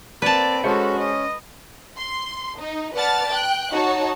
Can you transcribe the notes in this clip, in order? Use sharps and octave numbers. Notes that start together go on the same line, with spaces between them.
A#3 C4 B4 D5 A5
G#3 C#4 F#4 A4 C5 C#7
C#4 D#5
C6
D#4
B4 D5 F#5 A5 F6 A6
G5 F#6
D#4 F#4 C#5 A5